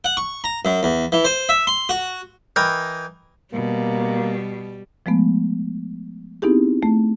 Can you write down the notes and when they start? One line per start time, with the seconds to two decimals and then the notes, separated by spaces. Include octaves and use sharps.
0.04 F#5
0.17 C#6
0.44 A#5
0.65 F#2
0.83 E2
1.12 E3
1.25 C5
1.49 E5
1.67 C6
1.89 F#4
2.56 E3 A#4 D#5 G5 D#6
3.53 B2 G3 A#3
5.06 F3 G#3 A3 B3
6.42 B3 C4 D#4 E4 G4 G#4
6.83 A3